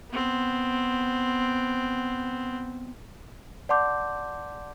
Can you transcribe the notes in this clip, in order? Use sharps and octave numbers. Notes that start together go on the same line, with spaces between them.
B3 C4
D5 F#5 A5 C6 D6 G6